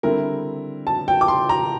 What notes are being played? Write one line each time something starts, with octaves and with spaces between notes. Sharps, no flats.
D3 G3 C4 E4 A#4
A5
G5
D6
C6
A#5